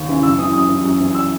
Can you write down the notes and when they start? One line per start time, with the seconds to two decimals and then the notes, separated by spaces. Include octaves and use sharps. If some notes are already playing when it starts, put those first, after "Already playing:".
Already playing: D#2
0.08 C#3 E3
0.23 F#2 E6
0.38 E3 D#6
0.53 F#2 D#6
0.69 E3
0.84 F#2
1.01 E3
1.15 E6